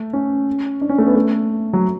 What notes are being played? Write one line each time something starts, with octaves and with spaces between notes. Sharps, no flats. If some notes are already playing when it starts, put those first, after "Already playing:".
Already playing: A3
C#4
D4
C#4
A3
B3
A3
F#3